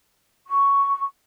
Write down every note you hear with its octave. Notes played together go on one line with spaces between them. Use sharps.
C#6